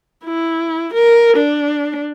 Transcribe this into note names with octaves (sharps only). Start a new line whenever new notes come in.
E4
A#4
D4